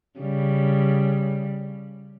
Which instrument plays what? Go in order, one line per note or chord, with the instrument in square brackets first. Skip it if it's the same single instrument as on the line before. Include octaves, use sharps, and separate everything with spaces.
[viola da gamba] C#3 G3